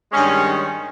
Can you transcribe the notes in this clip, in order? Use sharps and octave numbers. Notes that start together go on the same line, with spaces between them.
G2 D#3 G#3 C#4